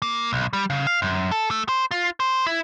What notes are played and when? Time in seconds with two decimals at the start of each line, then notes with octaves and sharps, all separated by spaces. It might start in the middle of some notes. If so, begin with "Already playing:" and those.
0.02 A#3
0.33 B1
0.53 G3
0.70 C#3
0.87 F5
1.02 F#2
1.31 A4
1.51 A3
1.69 C5
1.91 F4
2.20 C5
2.47 E4